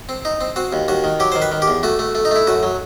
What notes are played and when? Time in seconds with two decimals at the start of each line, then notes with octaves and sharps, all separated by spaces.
0.09 C4
0.25 D#4
0.41 C4
0.56 C4 F#4
0.73 D#2
0.88 D#2 F#4
1.04 D#3
1.20 F#3 G4
1.32 D#3 C5
1.42 B4
1.52 D#3
1.62 G4
1.68 E2
1.83 A3 F#4
1.99 A3
2.15 A3
2.25 D#4
2.31 A3 E4
2.47 F#2 F#4
2.63 F#3